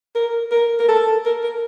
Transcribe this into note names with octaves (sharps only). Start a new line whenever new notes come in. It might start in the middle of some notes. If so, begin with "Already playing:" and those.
A#4
A#4
A#4
A4
A#4
A#4